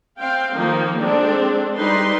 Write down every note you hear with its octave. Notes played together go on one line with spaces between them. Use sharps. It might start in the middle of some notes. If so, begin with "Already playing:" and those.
C4 F5 G5
D#3 F3 A#3 D#4
G#3 C4 D4 A4
G3 D#4 B4 C6